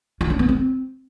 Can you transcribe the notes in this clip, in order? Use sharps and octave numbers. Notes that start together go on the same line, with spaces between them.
F4
D4
B3
C4